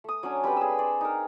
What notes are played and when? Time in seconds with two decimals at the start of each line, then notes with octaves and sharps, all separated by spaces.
0.04 A3 D#6
0.23 F#3 C#4 D4
0.44 G3 C4 G4 B4
0.57 G#4 E6
0.78 D5 C6
1.01 D#4 A#4